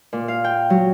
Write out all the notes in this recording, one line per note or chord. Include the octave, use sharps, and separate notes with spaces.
A#2
F5
G5
F#3